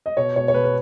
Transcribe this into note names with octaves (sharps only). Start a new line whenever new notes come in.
D#5
B2 C#5
B2 C#5
C#5
B2 B4
B4